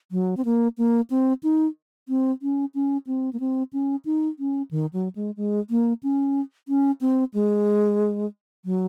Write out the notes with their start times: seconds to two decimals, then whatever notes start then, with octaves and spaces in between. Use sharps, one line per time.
0.12 F#3
0.37 C4
0.45 A#3
0.78 A#3
1.10 C4
1.43 D#4
2.09 C4
2.42 C#4
2.75 C#4
3.07 C4
3.33 A#3
3.40 C4
3.73 C#4
4.05 D#4
4.39 C#4
4.71 D#3
4.93 F#3
5.16 G#3
5.37 G#3
5.70 A#3
6.03 C#4
6.68 C#4
7.01 C4
7.34 G#3
8.65 F#3